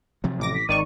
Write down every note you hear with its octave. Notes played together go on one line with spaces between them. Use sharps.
C3 F3 F#3
A1 D6 A#6
B6
G#1 D#3 D5 C#6 D#7